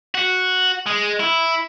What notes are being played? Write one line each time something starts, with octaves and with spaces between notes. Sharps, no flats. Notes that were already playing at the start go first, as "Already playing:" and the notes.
F#4
G#3
E4